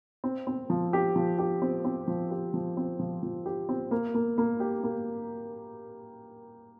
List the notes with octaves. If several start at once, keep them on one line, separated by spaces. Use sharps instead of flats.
C4
C4
F3
G4
F3
G4
C4
C4
F3
G4
F3
C4
F3
F3
G4
C4
A#3
A#3
A#3
G4
A#3